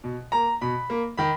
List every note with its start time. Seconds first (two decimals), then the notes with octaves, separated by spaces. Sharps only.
0.04 B2
0.32 A#3 A#5
0.61 B2 B5
0.90 A#3
1.17 D#3 B5